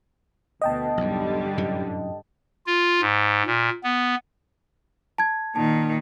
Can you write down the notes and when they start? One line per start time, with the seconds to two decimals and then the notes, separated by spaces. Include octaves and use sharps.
0.62 D2 B2 D#5 G5 A5
0.97 B1 E2 G2 D3 G3
1.58 F#2 A2 C3
2.66 F4
3.01 G#2
3.47 A#2
3.83 B3
5.18 A5 G#6
5.56 A#2 D#3 A5